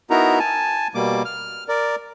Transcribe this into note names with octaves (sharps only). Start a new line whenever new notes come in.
B3 D#4 E4 F#4 A#4 A#5
G#5 A5
B2 G3 A#3 D6
F6
A#4 D5